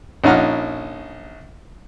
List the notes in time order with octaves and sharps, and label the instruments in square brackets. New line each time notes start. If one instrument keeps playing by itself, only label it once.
[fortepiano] A#1 C#4 D#4 F#5 F6